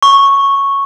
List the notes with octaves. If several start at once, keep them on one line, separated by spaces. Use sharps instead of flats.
C#6